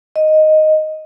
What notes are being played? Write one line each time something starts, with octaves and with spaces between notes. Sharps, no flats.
D#5